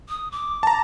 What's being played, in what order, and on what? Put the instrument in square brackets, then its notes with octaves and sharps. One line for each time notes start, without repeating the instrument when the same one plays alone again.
[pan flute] D#6
D6
[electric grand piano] A5 A#5